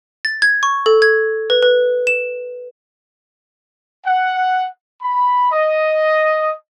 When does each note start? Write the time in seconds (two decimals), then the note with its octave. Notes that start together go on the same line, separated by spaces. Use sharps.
0.25 A6
0.42 G#6
0.63 C#6
0.86 A4
1.02 G#6
1.50 B4
1.63 B4
2.07 E7
4.06 F#5
5.02 B5
5.53 D#5